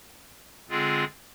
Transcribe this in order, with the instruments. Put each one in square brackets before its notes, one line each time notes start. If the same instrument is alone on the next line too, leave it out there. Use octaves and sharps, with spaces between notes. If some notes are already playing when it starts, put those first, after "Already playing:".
[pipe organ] D3 G#3 C4 F4 G#4